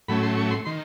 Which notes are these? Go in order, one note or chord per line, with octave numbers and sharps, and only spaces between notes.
A2 F#3 A3 C#4 B5
C6
C#6
C6
D#3 C6